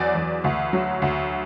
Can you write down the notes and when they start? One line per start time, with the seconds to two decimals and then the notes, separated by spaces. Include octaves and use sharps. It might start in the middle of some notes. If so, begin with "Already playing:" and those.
Already playing: E2 F#3 D5
0.15 E2
0.44 D2
0.73 F#3
1.02 D2